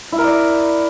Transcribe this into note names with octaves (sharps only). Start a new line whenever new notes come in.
E4
A#4
D5